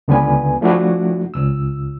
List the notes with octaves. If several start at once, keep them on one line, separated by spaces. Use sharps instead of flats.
C#2 D3 B3 B4 G#5
F3 A3 D4 E4 F#4
C#2 E6